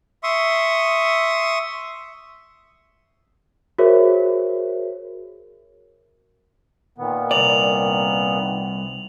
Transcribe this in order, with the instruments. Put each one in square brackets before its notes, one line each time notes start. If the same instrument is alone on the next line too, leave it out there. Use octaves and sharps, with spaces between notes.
[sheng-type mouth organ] E5 C6 C#6 D#6
[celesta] F#4 G#4 A#4 C5 C#5 E5
[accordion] A#2 D#3 B3
[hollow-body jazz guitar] C2 D5 [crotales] F7 F#7